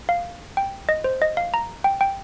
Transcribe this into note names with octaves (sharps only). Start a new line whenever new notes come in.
F5
G5
D#5
C5
D#5
F5
A#5
G5
G5